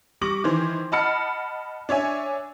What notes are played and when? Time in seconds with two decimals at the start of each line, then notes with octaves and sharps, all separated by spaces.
0.21 G3 C#6 D6 A#6 F#7
0.44 D#3 E3 C5
0.92 D#5 F#5 A5 B5 F6 C#7
1.89 D4 C#5 E5 G#5